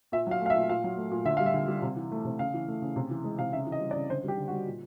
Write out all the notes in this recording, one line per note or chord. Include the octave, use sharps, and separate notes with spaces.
A#2 E5
F#3 F5
A3 F5
E5
A#2
A#2 F5
F#3
A3
A#2
D3 E5
G3 F5
E5
D3
G3
C3
E3
A3
C3
C#3 F5
E3
A3
C#3
C3
E3
G#3
C3 F5
C#3 E5
E3
D#5
G3
D5
C#3
D3 C5
G3 G4
D3
F#4
G3
A#2